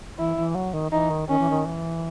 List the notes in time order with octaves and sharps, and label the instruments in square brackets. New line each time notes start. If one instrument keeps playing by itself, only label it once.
[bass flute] E3 [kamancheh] E4
[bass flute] E3
F#3
D#3
[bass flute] E3 [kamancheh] D#4
[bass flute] D#3
[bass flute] D#3 [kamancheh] C#4
[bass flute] E3
D#3
E3